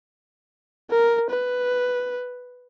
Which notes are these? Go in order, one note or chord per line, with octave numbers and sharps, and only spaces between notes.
A#4
B4